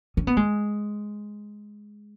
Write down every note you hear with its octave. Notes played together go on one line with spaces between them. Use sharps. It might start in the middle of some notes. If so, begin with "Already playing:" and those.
C#4
B3
G#3